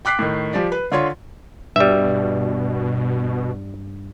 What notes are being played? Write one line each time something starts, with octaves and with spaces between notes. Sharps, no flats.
G5 D6 F#6 B6 C7
A2 D#3
F3 G4 D5
B4
D3 F4 C#5 C6
G2 B2 G3 E5